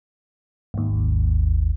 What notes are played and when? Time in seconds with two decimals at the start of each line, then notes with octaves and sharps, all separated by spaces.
0.74 G#1 D#2